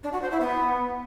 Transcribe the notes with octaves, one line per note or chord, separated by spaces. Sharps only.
D4
F#4
C5
E4
B3